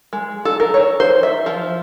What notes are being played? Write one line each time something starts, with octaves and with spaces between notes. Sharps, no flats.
G#3
A4
A#4
C#5
C5
E5
F3